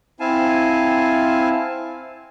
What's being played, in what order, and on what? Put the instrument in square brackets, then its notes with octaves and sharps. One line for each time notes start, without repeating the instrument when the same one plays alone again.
[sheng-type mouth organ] C4 E4 F5 G#5 A5